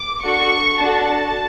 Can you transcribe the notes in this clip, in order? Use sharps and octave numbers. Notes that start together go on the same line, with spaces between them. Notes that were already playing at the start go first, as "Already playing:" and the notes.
Already playing: D6
D4 F#4 A4 C#6
D4 F#4 A4 A5